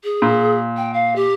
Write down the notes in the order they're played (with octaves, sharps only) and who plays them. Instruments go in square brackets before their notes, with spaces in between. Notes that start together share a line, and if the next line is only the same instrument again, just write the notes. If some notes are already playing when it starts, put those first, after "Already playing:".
[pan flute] G#4
[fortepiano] A#2
[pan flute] G5
F5
G4